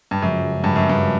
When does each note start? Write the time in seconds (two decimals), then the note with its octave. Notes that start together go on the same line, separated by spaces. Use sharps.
0.11 G2
0.22 F#2 C#3 F3 G#3
0.64 G2
0.76 F#2
0.89 G2